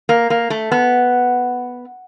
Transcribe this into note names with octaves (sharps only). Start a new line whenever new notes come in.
A#3
A#3
A3
B3